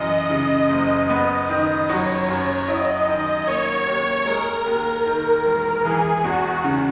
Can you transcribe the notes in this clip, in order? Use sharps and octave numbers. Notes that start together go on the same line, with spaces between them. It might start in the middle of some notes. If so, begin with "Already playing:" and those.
Already playing: F#2 E3 D#5
C#3
F#1
B3 D#5
D#3
F#3 C#5
F#2
E4 D#5
D#3
A#3 C#5
D#2
G#3 A#4
D#2
D#3
E1
E3 G#4
E2 F#4
C#3